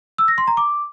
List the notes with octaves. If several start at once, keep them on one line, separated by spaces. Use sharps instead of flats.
E6
A#6
C6
A#5
D6